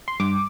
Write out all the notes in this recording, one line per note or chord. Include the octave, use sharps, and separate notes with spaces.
C6
G2 D6